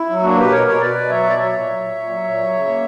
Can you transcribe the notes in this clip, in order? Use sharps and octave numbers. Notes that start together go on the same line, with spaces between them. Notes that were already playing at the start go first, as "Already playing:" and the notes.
Already playing: E4
F#3
A#3 D4 F#4
B2 G4 B4
B2 A#4 C#5
B2 A#4 C#5
B2 B4 D5
B2
F#3 C#5 E5
B2 D5
F#3 C#5 E5
A#2
F#3
A#2
A#2
F#3
A#2
F#3
C#3
A#3